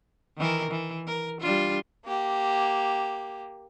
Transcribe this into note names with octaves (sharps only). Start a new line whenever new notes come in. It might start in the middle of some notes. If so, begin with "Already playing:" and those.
D#3 E3 A#4
E3
A#4
G3 D4 F4
A#3 G4